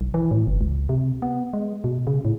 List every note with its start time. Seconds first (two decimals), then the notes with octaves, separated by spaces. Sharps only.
0.01 B1
0.14 E3
0.31 A2
0.47 G1
0.61 C#2
0.89 C3
1.22 B3
1.53 G#3
1.84 B2
2.07 C#3
2.25 A2